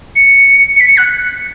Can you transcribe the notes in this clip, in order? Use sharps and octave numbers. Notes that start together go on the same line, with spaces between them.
C#7
C#7
B6
C#7
F#6